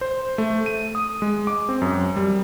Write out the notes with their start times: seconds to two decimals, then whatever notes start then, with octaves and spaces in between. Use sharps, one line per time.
0.01 C5
0.38 A3
0.66 D#7
0.95 D#6
1.22 G#3
1.47 D6
1.69 C4
1.82 F#2
2.16 G3